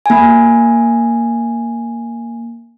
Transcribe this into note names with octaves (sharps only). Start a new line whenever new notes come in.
A#3 G#5